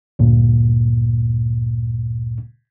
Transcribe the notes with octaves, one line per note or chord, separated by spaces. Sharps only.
D2 G2 A#2